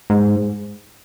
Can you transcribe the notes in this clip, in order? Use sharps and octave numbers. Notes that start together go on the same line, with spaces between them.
G#2